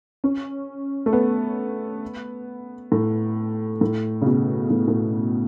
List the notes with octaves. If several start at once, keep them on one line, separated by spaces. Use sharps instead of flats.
C#4
A3
B3
A2
A2
C#3
B2
A2
A2